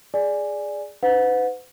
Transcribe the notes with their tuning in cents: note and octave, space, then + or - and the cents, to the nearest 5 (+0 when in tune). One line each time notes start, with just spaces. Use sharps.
G#4 +0 D5 +0 G#5 +0
D#4 +0 B4 +45 F#5 -30